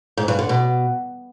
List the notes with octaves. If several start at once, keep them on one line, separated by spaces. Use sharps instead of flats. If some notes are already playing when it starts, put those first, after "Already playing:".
G#2
G2
D3
B2